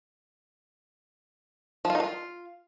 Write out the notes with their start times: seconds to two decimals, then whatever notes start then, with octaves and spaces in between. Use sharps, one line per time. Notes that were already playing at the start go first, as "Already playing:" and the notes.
1.85 F3
1.90 F4
1.95 D#4
2.00 F4